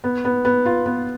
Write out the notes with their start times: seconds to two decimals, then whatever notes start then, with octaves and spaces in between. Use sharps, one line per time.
0.04 B3
0.25 B3
0.45 B3
0.65 F4
0.86 B3